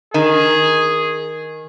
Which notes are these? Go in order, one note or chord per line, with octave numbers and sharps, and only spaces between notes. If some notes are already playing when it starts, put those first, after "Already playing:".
D#3 G#4